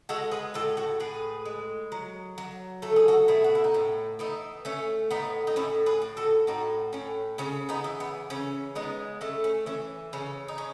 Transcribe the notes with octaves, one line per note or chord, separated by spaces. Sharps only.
G#3 F#4 A4
G#4 B4
A2 F#4 A4
F#4 A4
A2 G#4 B4
G#3
F#3
F#3
A3 A4
G#4
F#4 A4
B2 E4 G#4
F#4
E4
D#4
A2 C#4
E3 B3 D#4
A3 C#4
A2 B3 D#4
D#4
A2 C#4 E4
G#4 B4
A2
F#4 A4
A2 D#4 F#4
A2 C#4
C#3 C#4
B3 D#4
E3
B3
C#3 C#4
G#3 B3 D#4
A3 C#4
C#4
E3 C#4
C#3 C#4
D#4
C#4